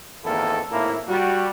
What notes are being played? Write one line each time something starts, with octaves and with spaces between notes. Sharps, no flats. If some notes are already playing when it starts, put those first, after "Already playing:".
G#1 E2 D#3 A#3 E4 A4
G#1 A2 A#3 E4
G3 F#4